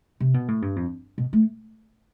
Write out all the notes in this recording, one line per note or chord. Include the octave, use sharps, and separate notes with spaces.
C3
B2
A2
G2
F2
B2
A3